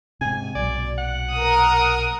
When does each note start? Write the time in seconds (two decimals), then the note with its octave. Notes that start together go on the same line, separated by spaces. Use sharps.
0.21 G#2 C3 G#5
0.55 B1 A#2 F#3 D5
0.98 F#5
1.34 A#4 D#6